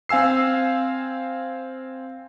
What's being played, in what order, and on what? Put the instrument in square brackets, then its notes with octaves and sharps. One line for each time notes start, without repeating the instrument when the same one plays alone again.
[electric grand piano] C4 F5 G#5 E6 C7